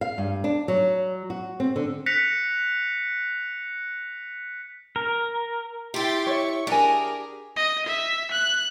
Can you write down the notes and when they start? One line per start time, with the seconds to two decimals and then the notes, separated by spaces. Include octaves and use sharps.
0.01 F5
0.18 G2
0.44 D4
0.68 F#3
1.30 F#4
1.60 C4
1.76 D3
2.06 F#6 A#6 B6 C#7 F7
4.96 A#4
5.94 E4 G4 G5 C6 A6
6.27 C#5 E5 C#6
6.67 D4 G4 G#4 A#4 G#5
7.56 D#5
7.87 E5
8.32 F#6